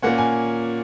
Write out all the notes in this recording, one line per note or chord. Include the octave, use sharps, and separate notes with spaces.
A#2 A#3 C#4 F#5
G#5